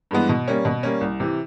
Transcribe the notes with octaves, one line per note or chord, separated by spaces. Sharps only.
G2 E3 G#3 B3
B2
G3 A#3 C#4
B2
G3 A#3 C#4
C2
C3 E3